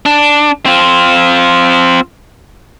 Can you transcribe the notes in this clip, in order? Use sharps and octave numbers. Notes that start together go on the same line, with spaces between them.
D4
C4 F4